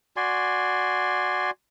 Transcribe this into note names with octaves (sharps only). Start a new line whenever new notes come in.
F#4 D5 G#5 C6